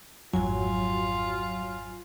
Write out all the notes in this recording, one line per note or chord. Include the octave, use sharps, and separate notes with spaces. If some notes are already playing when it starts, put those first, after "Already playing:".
G#1 F2 F#3 F4 G#5